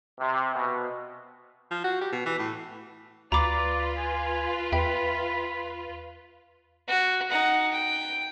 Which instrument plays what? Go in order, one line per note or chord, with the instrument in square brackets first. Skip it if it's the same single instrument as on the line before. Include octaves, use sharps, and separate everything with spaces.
[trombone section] C3
B2
[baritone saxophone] F3
F#4
G4
B2
E3
A2
[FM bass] D2 [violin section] F4 B4 [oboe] D5 [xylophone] A#5 B5 D6
[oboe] G#5
[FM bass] E2 [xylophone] E5 G5 [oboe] B5
[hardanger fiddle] F#4
D#4 F#5
G5